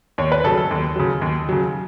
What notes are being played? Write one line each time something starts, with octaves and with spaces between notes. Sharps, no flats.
D#2 C#5
B4
C#3 F#3 A4
A4
D#2
C#3 F#3
D#2
C#3 F#3